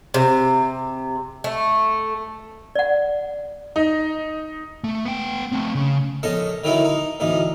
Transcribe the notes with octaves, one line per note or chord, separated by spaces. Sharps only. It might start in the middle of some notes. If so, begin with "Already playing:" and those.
C3
A3
D5 F#5
D#4
A3
B3 G5
A3 C4
C#3
A#1 C#4 A4 D#5 A5
D3 D#3 F#3 A3 D#4 E4
D#4
A1 D2 D#4